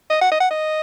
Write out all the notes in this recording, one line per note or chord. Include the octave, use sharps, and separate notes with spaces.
D#5
F#5
D#5
F#5
D#5